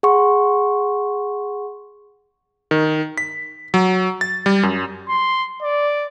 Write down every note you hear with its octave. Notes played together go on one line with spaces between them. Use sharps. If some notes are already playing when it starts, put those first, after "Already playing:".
G#4 F#5 C6 C#6
D#3
B6
F#3
A6
G3
F#2
C6
D5